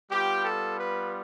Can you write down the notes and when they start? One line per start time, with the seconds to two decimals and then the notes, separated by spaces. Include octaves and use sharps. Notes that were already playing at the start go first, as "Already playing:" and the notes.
0.11 G3 B3 F4 G4
0.45 A4
0.79 B4